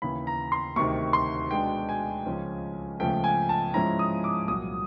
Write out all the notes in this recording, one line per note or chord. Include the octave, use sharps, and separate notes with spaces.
D#2 C#3 E3 B5
A#5
C6
D2 C3 D#3 C#6
C6
B2 G#3 B3 D4 G5
G#5
C#2 C#3 F3 G#3 C#4
C#2 C#3 F3 A3 G5
G#5
A5
G#2 F3 G#3 C#4 E4 A#5
D#6
D6
C2 A#2 F#3 D#6